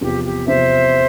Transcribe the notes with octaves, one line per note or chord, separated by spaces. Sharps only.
E2 C3 F3 G4
G4
E2 C3 F3 C5 E5